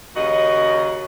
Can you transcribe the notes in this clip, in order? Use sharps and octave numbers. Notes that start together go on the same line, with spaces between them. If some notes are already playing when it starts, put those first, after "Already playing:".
D#2 C#3 F#4 D#5